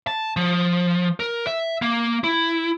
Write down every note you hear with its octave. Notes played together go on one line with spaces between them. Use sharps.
A5
F3
A#4
E5
A#3
E4